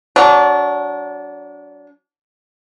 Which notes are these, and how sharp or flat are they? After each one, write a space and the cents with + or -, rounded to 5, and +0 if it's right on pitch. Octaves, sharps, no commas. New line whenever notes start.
F#3 +0 D4 -25